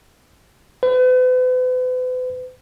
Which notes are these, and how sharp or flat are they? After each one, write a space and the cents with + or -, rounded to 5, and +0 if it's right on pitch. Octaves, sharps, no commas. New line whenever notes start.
B4 +40